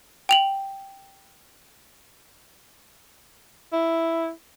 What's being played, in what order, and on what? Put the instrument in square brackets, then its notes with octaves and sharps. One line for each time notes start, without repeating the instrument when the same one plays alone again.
[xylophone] G5 F7 F#7
[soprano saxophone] E4